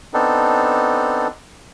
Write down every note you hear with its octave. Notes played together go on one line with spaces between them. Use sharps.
B3 C4 D4 D#4 A4